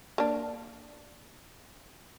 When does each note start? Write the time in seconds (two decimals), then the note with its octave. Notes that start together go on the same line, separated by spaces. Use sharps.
0.18 A#3 D4